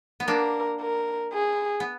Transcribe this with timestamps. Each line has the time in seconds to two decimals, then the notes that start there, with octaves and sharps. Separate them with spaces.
0.20 B3
0.27 A#3 D4 A#4
0.81 A#4
1.34 G#4
1.80 B3